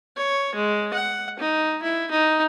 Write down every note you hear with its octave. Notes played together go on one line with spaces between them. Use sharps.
C#5
G#3
F#5
D#4
E4
D#4